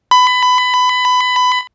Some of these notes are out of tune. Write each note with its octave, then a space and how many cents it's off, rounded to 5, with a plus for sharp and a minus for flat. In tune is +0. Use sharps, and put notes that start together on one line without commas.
B5 +20